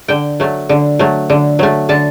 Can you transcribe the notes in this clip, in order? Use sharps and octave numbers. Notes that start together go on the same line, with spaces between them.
D3 G5
F#3 A3
D3
F#3 A3
D3
F#3 A3
D3 A5